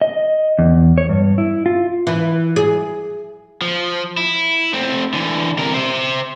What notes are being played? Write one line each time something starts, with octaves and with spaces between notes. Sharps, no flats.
D#5
E2
C#5
G2
E4
F4
E3
G#4
F3
E4
A3 C4
D3 E3
C3 A#4
C5 E5